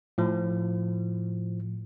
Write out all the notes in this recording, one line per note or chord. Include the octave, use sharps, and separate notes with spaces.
A2 F3